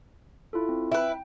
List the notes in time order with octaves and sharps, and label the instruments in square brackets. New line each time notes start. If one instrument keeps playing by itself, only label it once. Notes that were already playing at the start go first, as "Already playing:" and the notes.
[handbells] E4 F4 A4
C4
[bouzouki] E4 B4 [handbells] G5